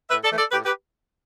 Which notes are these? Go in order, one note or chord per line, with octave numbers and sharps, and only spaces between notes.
A2 B4 E5
A4 D5
E3 A3
A4 D5
A2 G4 B4
G4 B4